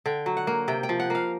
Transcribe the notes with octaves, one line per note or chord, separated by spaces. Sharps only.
D3 G5
F#3
F#5
A#3
C3 G5
G5
F3
F#5
A#3 F5